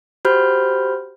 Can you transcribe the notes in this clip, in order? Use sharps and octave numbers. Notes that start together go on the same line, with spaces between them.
F#4 G4 C5 B5 F6 G6